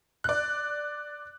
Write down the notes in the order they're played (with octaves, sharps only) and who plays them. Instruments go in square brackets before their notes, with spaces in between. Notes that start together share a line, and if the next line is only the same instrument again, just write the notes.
[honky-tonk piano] D5 F#6